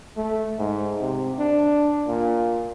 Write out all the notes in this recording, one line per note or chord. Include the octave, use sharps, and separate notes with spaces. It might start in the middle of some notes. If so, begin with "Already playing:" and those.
A3
G#2
C3
D4
A#2